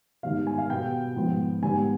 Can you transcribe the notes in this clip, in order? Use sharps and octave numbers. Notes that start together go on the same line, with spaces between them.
G#2 D#3 G3 B3 F5
G#5
F5
B2 G3 B3 G5
G#2 F3 B3
G#2 D#3 G3 B3 G#5